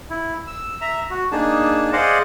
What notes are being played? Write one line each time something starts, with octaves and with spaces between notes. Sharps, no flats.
E4
E6
E5 A#5
F#4
A#3 D4 D#4 G#4 A5
G#4 C5 D5 D#5 F5 F#5